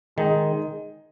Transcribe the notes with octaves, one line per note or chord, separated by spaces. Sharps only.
D#3 G#3 D#4 G#4 D#5